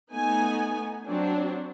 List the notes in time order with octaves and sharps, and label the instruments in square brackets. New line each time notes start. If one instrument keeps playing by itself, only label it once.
[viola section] A3 B3 D#4 G#5
F#3 C4 D4